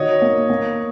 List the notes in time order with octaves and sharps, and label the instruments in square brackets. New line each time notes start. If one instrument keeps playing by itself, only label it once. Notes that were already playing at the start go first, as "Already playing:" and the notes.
Already playing: [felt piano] D#3 F#4 [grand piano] C#5 D#5
[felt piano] A#3
A#3